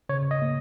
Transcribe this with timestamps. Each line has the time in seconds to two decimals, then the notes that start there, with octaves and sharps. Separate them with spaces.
0.09 C#3 C#5
0.31 D#5
0.42 A#3